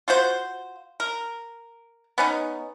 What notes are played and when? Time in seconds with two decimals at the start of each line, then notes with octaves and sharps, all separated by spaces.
0.08 F4 F#4 C5
1.00 A#4
2.18 B3 C#4 D#4